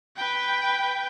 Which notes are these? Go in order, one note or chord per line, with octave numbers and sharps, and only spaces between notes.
B4 G5